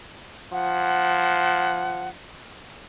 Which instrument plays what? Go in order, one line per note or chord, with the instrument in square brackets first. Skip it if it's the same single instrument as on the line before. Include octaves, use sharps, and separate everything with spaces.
[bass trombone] F3 [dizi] F#5